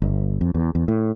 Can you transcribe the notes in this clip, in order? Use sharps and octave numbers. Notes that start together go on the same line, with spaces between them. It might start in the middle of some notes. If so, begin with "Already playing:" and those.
G1
F2
E2
E2
A2